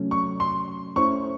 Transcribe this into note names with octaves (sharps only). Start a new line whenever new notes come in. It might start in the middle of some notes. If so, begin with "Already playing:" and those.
Already playing: C3 F#3 A3 C#4
C#6
C6
A3 C#4 E4 C5 C#6